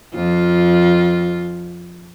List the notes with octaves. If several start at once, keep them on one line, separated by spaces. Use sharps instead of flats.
F2 F4